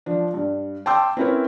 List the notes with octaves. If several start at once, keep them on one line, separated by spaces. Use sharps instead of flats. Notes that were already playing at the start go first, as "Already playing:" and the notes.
F3 D4
G2
G5 A5 C6 D6 E6 G6
C4 C#4 E4 A#4 B4 C#5